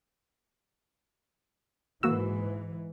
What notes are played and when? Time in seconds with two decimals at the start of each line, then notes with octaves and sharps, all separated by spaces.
2.03 G#2 E3 A#3 F#4 E6